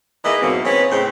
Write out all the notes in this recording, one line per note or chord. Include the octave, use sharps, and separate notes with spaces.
E3 A#3 D#4 E4 G#4 D#5
G#2 B2 E3 F#3 A#3 C4
C4 C#4 G#4 B4 C#5
A2 C#3 G#3 C4